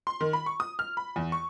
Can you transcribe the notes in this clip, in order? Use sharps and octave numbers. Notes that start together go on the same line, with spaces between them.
C6
D#3
B5
C#6
D#6
F6
B5
E2
C#6